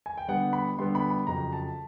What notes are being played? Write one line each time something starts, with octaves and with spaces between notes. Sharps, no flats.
G#5
G5
D3 G3 B3 F#5
B5
D3 G3 B3 C6
B5
B5
F2 C#3 F#3 A#5
A5